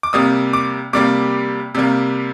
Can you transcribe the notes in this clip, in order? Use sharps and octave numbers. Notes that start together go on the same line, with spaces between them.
D6
C3 G3 A#3 D#6
D6
C3 G3 A#3 D6
C3 G3 A#3